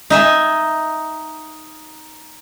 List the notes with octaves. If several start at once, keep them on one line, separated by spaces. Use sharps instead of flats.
D#4 E5 G#5